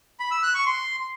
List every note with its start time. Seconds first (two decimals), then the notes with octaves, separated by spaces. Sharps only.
0.20 B5
0.31 E6
0.43 F#6
0.54 C#6
0.66 C6